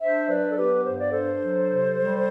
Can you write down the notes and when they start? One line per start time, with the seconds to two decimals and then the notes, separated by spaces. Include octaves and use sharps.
0.01 D4 C5 E5
0.28 F#3 B4 D5
0.49 A4
0.56 B3 G4 B4
0.84 G2 C5
0.98 D5
1.11 D4 A4 C5
1.39 F#3
1.68 C3
1.96 G3